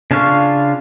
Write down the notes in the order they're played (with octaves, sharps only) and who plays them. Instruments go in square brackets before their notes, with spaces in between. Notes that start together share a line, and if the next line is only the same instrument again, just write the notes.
[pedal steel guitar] C#3 D4 F4 F5 C#6